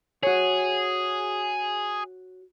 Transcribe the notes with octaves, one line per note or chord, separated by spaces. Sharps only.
F#4 G#4 C#5